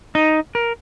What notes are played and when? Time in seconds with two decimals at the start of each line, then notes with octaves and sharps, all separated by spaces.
0.15 D#4
0.55 A#4